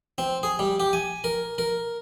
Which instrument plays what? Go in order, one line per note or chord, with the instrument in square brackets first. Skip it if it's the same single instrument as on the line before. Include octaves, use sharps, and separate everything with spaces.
[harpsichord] C4
G#4
G3
G4
G#5
A#4
A#4